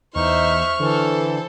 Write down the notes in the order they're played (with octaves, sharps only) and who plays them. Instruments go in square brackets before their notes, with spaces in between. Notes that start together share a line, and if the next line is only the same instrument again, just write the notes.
[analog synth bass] E2 [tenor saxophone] D#4 [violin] C5 E5 [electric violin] C#6 F6
[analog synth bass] D3 [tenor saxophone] E3 [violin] A4 C5